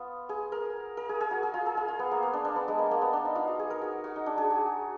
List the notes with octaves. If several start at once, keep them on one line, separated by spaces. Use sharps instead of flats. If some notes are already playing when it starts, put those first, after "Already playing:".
Already playing: B3 F4
G#4
A#4
A#4
G#4
G#4
F#4
G#4
F4
G#4
F4
F4
B3
A#3
B3
D4
D4
B3
G#3
A#3
A#3
B3
D4
D#4
F4
F#4
G#4
A#4
F#4
F#4
D#4
D4
G#4
F#4